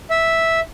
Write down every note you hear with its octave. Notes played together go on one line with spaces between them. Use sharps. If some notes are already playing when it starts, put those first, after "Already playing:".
E5